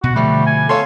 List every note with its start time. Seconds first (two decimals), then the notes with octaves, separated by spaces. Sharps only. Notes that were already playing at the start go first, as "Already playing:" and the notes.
0.03 B2 F#4
0.16 B2 D3 F3 G3 A3
0.46 G#5
0.69 A4 C#5 F5 C6